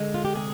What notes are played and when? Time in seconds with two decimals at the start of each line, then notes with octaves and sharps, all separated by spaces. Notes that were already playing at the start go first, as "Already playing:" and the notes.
Already playing: D3 G#3
0.14 F4
0.25 G4
0.35 C3 G#4